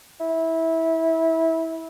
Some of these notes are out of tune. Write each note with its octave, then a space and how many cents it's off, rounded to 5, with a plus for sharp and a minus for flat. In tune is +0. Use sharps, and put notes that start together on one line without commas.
E4 -20